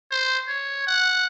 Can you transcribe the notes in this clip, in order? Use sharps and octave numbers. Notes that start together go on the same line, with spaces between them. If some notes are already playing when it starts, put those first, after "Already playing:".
C5
C#5
F#5